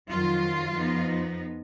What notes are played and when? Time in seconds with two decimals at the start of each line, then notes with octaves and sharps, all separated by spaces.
0.10 F2 D#3 F#3 F4
0.74 F2 F3 B3 D#4